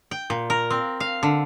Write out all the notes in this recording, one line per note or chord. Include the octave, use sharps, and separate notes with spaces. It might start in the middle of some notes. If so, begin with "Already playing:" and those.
G5
A#2
A#4
C4
F5
D3